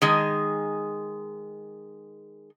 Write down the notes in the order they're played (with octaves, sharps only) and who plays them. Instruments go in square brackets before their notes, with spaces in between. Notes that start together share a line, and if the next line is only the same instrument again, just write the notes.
[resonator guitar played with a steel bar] D#3 G#3 G#4